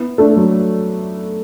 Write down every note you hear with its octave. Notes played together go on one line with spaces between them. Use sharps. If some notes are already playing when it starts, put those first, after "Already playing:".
Already playing: B3 E4
A3 D4
F#3